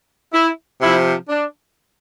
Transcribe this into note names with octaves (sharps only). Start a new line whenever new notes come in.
E4
C3 F3 E4
D4